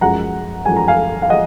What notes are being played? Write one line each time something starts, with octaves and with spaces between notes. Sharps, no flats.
F#2 F3 G#3 F#5 A#5
F#2 F3 G#3 G#5
A#5
F5 G#5
F5
F3 G#3 D#5 F#5